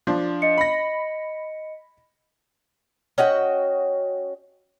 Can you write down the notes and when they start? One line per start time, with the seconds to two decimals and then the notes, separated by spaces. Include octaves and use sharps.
0.07 F3 D4
0.42 D#5 C#7
0.58 B5 A#6
3.18 C#4 F#4 D#5 G5